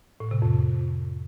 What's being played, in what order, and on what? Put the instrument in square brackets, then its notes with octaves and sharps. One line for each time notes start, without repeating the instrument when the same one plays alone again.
[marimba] A2
C3
F2